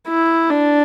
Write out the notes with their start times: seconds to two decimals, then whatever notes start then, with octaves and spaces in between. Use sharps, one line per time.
0.09 E4
0.50 D4